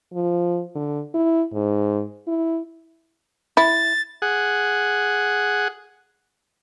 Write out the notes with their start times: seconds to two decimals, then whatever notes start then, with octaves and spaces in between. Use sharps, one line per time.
0.13 F3
0.75 D3
1.14 E4
1.53 G#2
2.27 E4
3.57 E4 A6
4.22 G#4 F#5